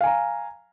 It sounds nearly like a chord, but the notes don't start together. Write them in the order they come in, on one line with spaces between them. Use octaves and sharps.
F5 G#5 A#5